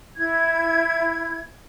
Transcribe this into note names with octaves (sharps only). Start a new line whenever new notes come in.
E4 G#6